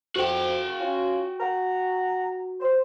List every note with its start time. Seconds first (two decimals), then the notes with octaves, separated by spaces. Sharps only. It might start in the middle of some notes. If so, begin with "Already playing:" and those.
0.16 F2 F#4 G5
0.80 C#4 F4
1.41 F#5 A#5
2.60 C5